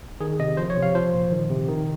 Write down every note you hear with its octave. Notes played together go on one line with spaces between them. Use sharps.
D#3 G#4
C3 D#5
F3 C5
C#5
C3
F5
F3 C5
A#2
D#3
C3
D#3